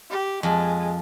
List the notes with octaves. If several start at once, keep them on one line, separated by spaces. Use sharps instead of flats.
G4
F2 G#3